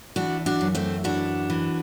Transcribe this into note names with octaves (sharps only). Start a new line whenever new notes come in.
E3 D4 F#4
D4 F#4
F#2
A3 C4
E3 D4 F#4
E3